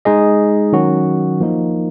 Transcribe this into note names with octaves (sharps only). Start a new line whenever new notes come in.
G#3 D#4 G#4 D#5
D#3 F#3 C#4 F#4
F3 A#3 D#4 A#4